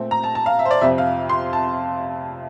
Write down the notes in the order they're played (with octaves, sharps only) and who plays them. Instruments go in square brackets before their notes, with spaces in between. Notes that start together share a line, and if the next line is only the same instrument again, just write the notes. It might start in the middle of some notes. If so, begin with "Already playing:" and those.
Already playing: [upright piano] A#2 A3 C4
A#5
A5
A5
F5
E5
C5
D5
F2 C3 F3 C4 E5
F5
C6
A5